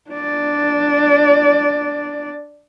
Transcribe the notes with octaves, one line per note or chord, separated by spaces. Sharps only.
D4 D5